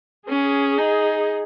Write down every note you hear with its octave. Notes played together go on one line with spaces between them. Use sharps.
C#4 G#4
D#4